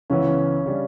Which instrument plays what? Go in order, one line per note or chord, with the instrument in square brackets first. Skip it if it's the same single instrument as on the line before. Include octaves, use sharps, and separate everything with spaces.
[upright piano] C#2 C#3 E3 B3 E4 [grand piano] C#4
[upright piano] C#3 G3 D4